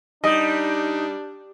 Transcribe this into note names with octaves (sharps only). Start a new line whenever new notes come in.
G3 D4 D#4 D#5